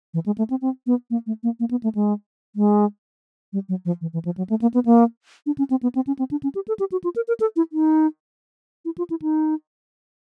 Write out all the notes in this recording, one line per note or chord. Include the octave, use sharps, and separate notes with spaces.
E3
G#3
A3
C4
C4
B3
A#3
A3
A#3
A#3
B3
A3
G#3
G#3
G3
F#3
F3
E3
E3
F3
F#3
A3
A#3
B3
A#3
D4
C#4
C4
B3
C4
C#4
C4
D4
C#4
G4
A4
G4
F#4
F4
A#4
A#4
A4
E4
D#4
E4
F4
E4
D#4